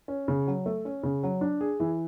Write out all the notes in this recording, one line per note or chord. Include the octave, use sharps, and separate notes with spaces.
C#4
C#3
F#3
A3
C#4
C#3
F#3
D4
G#4
E3